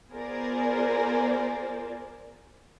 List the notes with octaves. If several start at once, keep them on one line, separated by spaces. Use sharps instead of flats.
B3 F4 G#4 A#4 C5 D5